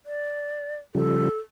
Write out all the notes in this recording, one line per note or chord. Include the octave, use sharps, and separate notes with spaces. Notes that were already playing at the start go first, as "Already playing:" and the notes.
D5
C#3 F3 G3 A4